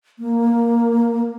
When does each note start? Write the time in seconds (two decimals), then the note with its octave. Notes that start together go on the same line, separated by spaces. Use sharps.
0.19 A#3